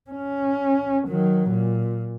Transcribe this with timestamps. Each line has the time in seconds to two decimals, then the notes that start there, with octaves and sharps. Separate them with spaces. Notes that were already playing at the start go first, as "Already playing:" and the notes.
0.11 C#4
1.08 D#3 F#3
1.50 A#2